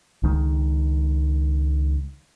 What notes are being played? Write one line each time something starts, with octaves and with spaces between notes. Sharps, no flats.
C#2 D#3 G#3